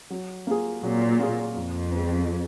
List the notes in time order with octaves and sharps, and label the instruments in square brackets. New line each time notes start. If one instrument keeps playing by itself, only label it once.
[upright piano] F#3
A#3 F4 G#4
[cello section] A#2 [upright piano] F#3
[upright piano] A#3 F4 G#4
[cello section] F2 [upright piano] F3
[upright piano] G#3 B3
F3